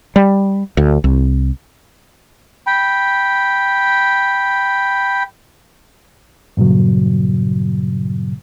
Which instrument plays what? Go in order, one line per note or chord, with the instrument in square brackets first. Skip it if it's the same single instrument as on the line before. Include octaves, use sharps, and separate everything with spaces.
[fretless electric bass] G3
D2
C2
[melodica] G5 B5
[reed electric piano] G2 A#2 C#3 F#3